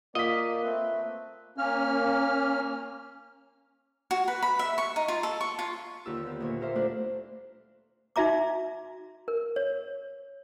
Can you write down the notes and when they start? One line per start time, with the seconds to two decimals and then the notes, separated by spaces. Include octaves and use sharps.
0.15 A#3 F4 D5 D#5 B6
0.62 A3 C4 B4
1.58 A#3 C#4 F6
4.11 F#4
4.28 B4
4.43 B5
4.59 E5
4.78 C#6
4.96 D#4
5.08 F4
5.23 A4
5.41 C#6
5.59 F4
6.06 D#2 D3 F4 G4 E6
6.26 B3
6.40 D2 A#2 C#5
6.61 G4 A#4 C5 E5 F5
6.75 A3 D4 E4 F4 A4 A#4
8.16 D#4 F#4 E5 A#5 D6
9.28 A#4
9.56 C#5